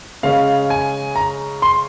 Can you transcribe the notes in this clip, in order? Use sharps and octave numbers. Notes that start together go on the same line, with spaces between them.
C#3 G#3 C#4 F5
G#5
A#5
C6